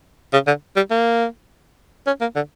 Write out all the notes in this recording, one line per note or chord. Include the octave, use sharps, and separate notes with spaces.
C#3
D3
G3
A#3
C#4
A#3
D3